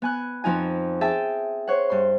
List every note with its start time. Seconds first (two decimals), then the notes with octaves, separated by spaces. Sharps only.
0.02 B3 G#5 F#6
0.44 F2 F3 D#4 G#5
1.01 G#4 E5 G5 A5
1.67 C5 C#5 F#5
1.90 G2 C6